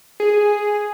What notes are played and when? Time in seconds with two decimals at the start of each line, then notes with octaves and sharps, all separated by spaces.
0.20 G#4